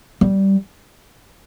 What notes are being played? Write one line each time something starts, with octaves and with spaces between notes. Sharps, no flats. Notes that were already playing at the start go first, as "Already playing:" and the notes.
G3